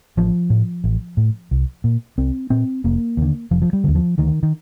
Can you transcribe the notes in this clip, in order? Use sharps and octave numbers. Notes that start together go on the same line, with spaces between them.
A1 F3
A2
A1
A2
C2
A#2
C2 C4
A#2 C4
F1 A#3
D#2 D3
F1 F3
F3
G3
D#2 D3
F3
D2 D#3
D#3